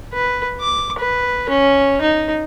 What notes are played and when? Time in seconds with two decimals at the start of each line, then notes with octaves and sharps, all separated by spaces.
0.14 B4
0.61 D6
0.99 B4
1.49 C#4
2.02 D#4